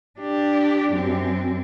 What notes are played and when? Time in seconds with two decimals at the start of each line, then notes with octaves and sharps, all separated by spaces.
0.20 D4 G4
0.93 F#2 C4